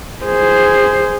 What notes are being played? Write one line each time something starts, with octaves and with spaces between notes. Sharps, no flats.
G#4 C5